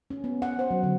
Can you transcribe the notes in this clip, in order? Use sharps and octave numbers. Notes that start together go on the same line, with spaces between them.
C#4
B3
F#5
C5
F#3
D3